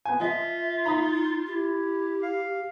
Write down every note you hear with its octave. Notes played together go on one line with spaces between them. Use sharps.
B3 G#5
F3 F4 D#5 E5
D#4 A#5 B5 D#6
E4 G4
F5